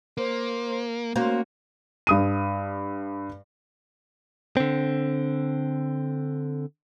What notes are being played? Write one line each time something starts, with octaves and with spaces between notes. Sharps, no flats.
A#3 C5
A#3 C#4 F#4 C5
G2 D#6 D#7
D3 C4